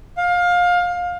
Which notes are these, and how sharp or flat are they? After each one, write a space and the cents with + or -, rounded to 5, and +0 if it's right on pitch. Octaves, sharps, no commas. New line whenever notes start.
F5 +25